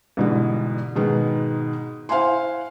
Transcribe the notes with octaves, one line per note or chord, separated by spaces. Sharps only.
C2 G#2 B2 D3 E3
G#2 B2 D#3 G#3 B3
E4 C5 F5 F#5 G#5 C6